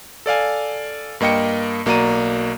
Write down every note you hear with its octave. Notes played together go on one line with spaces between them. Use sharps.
A4 D5 F5 G#5
G2 A#3 D#5 G5 C#7
B1 A#3 F#4 D5 A#5 D#7